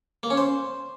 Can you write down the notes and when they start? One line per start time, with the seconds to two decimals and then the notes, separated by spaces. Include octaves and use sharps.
0.23 A#3
0.30 C#4
0.37 C5